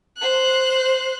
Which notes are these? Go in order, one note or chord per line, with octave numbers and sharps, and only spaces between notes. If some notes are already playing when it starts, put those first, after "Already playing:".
C5 F#6